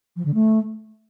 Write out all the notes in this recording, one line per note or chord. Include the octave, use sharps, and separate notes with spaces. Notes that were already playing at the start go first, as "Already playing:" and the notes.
F3
D3
A3